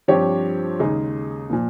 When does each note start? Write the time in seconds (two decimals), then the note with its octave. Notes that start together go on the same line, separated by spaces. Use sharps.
0.08 G2 F3 C4 G4 C#5
0.79 D#2 C#3 G#3 D#4 G#4
1.50 A#2 F3 A#3